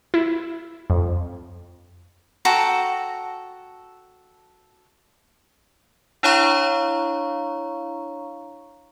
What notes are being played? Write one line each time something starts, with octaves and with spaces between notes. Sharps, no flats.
E4
F2
F#4 A4 G5 A#5
D4 E4 C#5 F5 A#5 C#6